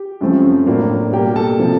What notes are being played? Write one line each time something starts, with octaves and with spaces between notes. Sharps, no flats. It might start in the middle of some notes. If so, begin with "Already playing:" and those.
Already playing: G4 G5
F#2 C#3 F3 A3 C4
A2 F#3 A#3 D4
B2 G3 A#3 G4 G5
A4 A5
C3 F3